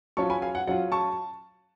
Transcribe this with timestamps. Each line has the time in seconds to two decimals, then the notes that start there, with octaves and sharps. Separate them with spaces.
0.17 F#3 C#4 F4 A5 C#6
0.30 G#5 B5
0.42 F5 G#5
0.55 F#5
0.67 F#3 C#4 F4 F#5
0.92 A5 C#6